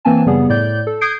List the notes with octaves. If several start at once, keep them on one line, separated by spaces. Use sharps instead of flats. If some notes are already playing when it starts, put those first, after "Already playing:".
E3 A#3 C4 G#5 A5
F#2 C#3 G3 B3 G#4
A2 D5 G6
A4
D#6 G6 G#6 C7 D7